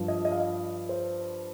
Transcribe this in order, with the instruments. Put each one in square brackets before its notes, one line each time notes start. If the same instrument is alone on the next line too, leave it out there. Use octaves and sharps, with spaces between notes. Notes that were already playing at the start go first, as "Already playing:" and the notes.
Already playing: [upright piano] G2 F3
D#5
D#5
F5
D#5
C5